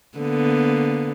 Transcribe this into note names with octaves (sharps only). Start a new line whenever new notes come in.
D3 A#3 B3